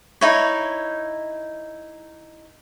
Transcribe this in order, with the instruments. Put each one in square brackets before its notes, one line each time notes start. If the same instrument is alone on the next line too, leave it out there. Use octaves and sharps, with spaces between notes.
[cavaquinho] D#4 E4 C#5